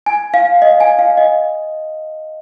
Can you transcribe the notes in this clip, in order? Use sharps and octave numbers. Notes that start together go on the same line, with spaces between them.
G#5
F5
D#5
G#5
F5
D#5